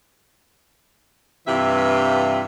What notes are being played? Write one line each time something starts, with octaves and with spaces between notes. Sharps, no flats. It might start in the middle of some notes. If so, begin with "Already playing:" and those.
G2 C3 E3 F4 E5 F5